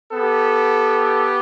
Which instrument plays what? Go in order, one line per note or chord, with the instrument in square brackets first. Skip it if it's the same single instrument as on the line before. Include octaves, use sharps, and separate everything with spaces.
[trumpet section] B3 G4 A4